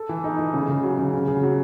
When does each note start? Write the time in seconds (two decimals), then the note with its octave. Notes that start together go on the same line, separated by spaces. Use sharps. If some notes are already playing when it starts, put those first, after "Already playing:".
Already playing: A4
0.09 E3
0.24 D#4
0.39 E3
0.54 C#3
0.69 C#3
0.83 F#3
0.99 C#3
1.14 C#3
1.28 C#3
1.43 F#3